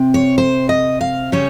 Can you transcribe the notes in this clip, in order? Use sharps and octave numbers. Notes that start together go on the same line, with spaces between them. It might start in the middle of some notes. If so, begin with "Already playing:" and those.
Already playing: C3 C4
C#5
C5
D#5
F5
C#3 G3 C#4 C#5